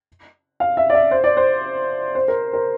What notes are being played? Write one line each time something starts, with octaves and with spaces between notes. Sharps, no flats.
F5
E5
D5
E5
C5
D5
C5
C5
A#4
A#4